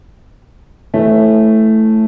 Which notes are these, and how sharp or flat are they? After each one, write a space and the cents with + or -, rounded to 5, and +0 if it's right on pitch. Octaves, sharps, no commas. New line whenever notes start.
E3 +0 A3 +0 C#5 -40